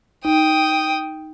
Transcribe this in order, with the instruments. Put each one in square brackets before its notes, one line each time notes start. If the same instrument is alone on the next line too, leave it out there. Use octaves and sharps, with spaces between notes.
[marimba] D#4 [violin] G5 D#6